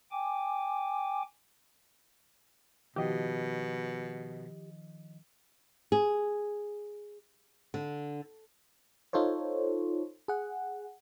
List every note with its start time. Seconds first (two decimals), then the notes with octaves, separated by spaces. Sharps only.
0.11 G5 G#5 D6
2.96 B2 D#3 F3 G4 D#5
5.92 G#4
7.74 D3
9.13 D#4 F4 A4 C5 C#5
10.28 G#4 F#5